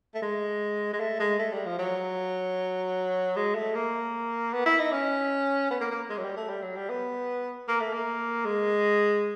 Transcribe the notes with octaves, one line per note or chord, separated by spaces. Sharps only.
A3
G#3
G#3
A3
G#3
A3
G3
F3
F#3
G#3
A3
A#3
B3
E4
D#4
C#4
B3
A#3
A#3
G#3
F#3
G3
A3
G3
F#3
G3
B3
A#3
A3
A#3
G#3